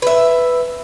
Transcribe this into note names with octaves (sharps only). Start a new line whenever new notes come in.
B4 E5